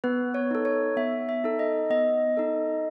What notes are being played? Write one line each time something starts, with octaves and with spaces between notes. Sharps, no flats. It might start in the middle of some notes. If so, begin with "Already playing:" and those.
B3 B4
C#5
D#4 A4
C#5
B3 E5
E5
D#4 A4
D#5
B3 D#5
D#4 A4